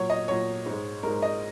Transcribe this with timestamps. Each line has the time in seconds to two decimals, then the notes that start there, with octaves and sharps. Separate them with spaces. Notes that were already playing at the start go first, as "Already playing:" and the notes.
Already playing: A#2 F#3 C#5
0.10 D#5
0.28 A#2 F#3 C#5
0.66 G#2 G#3
1.03 G#2 G#3 A#4
1.22 D#5